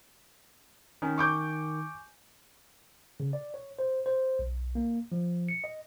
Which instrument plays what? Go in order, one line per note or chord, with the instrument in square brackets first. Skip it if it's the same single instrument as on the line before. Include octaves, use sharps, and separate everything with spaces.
[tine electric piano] D#3 [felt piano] C#4 [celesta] G#5
[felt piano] C#6 D6 G6
[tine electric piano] C#3
D5
C#5
C5
C5
B1
A#3
F3
C#7
D#5